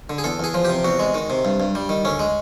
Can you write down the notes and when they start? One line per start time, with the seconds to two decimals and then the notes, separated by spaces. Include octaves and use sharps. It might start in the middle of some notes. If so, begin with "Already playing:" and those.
0.10 D3
0.18 G#4
0.24 E2 A4
0.39 E2 G#4
0.54 F3
0.65 C3 G4
0.84 E2 F#4
0.99 G#3
1.14 D#3
1.30 C3
1.45 G2
1.60 G2
1.75 G3
1.89 D#3
2.05 D2 C#4
2.19 G#3